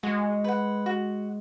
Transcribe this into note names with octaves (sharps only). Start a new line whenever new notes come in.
G#3 F#4
B4 F#5
F#4